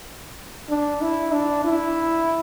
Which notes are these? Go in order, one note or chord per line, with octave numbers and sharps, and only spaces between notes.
D4
E4
D4
E4